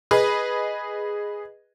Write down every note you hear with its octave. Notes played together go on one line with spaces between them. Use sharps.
G#4 B4 D#5